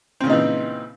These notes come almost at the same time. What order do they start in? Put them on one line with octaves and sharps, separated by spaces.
C4 C#3 A#2 D#4 E3